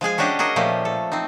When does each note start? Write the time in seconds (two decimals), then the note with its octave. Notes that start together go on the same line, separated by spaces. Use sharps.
0.01 F3 G#3 G#4 G#5
0.18 C#4 D4 F#4 G4 D#5
0.39 F#4 G#4 A#4 D#5
0.56 A#2 F3 A3 G4
0.85 A4
1.12 C4 D#4